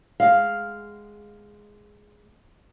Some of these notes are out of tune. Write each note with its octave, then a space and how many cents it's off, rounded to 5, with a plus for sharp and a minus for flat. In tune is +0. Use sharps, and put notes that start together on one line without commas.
G#3 +0 F5 +0